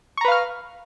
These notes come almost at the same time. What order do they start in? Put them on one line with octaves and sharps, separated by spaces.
C#6 A#5 B4 F5 F6